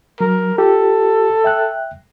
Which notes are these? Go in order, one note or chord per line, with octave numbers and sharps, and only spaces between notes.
F#3 A#4
F4 G4 A4
E5 G5 F#6